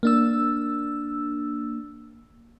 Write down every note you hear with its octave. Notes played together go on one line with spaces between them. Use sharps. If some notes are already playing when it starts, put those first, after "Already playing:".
A#3 D4 E6